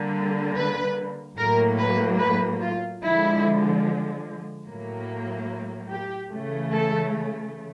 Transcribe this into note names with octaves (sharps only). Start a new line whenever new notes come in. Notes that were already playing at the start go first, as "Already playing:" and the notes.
Already playing: D3 G3 A#3
B4
A2 F#3 A#3 A#4
B4
B4
F4
D3 F3 G#3 E4
A2 F#3 A#3
G4
C#3 E3 A3
A4